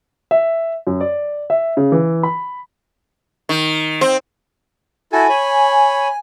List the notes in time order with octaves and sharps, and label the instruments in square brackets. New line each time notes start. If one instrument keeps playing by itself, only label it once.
[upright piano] E5
F#2
D5
E5
C#3
E3
B5
[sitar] D#3
C4
[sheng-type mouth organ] E4 F#4 A4 [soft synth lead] G#5
[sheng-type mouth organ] C#5 B5